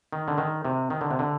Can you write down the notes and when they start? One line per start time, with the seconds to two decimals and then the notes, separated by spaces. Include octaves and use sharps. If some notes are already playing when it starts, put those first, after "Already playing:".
0.13 D#3
0.28 D3
0.38 D#3
0.65 C3
0.90 D#3
1.01 D3
1.11 C3
1.19 D3